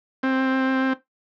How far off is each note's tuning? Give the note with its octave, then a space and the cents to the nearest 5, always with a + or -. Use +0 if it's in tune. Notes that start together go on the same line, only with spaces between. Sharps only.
C4 +10